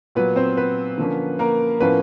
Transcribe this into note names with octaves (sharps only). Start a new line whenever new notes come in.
A#2 F#3 B3 B4
C4 C5
B3 B4
D3 F3 A#3 C#4
A#3 A#4
A2 F3 A#3 B3 C#4 B4